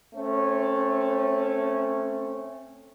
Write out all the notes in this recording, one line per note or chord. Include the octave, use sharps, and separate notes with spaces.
A3 C4 C#4